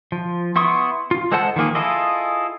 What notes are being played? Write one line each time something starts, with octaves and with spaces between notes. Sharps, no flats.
F3
B3 E4 C6 C#6 D#6
F4
G#3 A4 C5 F#5 A5
D#3 F3 A#3 G#4
E4 F4 G#4 A4 D#5